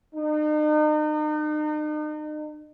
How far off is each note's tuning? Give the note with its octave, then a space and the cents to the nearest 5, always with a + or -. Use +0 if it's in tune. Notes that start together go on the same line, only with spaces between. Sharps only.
D#4 -40